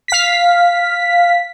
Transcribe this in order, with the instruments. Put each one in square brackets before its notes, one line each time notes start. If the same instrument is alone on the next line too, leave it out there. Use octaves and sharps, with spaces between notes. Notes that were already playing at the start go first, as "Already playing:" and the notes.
[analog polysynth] F5 B6